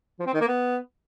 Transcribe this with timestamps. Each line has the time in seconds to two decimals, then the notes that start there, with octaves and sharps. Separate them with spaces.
0.19 F3
0.27 C4
0.34 D#3
0.41 A#3
0.48 B3